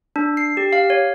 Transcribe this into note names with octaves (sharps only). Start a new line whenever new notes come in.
D4
C7
G4
F5
C#5